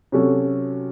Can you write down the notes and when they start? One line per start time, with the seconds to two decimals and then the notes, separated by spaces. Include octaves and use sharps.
0.12 C3 F#3 C#4 F#4 A4